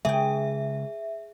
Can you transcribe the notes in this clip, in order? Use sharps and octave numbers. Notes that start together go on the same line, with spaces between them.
C#3 G#3 G#4 E5 G5